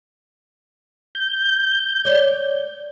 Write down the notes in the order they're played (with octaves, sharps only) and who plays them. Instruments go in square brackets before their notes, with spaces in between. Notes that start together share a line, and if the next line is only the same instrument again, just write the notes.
[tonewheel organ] G6
[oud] C#5 D5